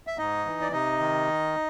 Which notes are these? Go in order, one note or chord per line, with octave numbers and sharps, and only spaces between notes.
E5
G#2 D#4 D#5
E3
D5
C3 D#4 D#5
D#3